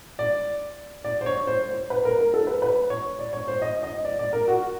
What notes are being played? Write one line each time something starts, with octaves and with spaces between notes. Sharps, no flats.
D5
D5
C5
C#5
C5
C5
B4
A#4
A#4
A4
B4
B4
C#5
D5
C#5
C5
D#5
D#5
D5
D5
A#4
F#4